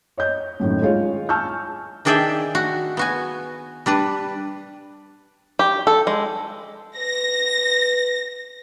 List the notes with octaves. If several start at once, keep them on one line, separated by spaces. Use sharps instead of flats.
C#5 D#5 G6
F#2 A2 D#3
G#3 F4 C#5
G#5 A5 C#6 E6 F6 G6
D#3 D4 G#4 D5 E5 G5
F#4
B3 F#4 G#5
G3 D4 B4
G4
A4
G#3
B4 A#6